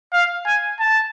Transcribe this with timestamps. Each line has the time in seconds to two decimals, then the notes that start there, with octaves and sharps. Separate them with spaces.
0.13 F5
0.46 G#5
0.80 A5